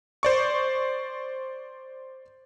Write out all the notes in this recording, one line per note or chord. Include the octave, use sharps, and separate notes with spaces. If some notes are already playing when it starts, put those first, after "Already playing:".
C5 D5 C#6